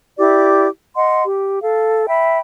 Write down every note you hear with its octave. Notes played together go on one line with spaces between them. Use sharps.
E4 G4 D5 D6
D#5 F#5 C6
G4
A4 F5
E5 G5 B5